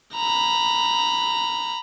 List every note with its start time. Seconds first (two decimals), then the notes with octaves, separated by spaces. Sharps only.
0.15 A#5 B5